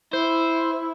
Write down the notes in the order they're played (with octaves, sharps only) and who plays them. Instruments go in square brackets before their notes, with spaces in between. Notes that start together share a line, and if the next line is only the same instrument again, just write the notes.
[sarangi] E4 [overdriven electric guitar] C5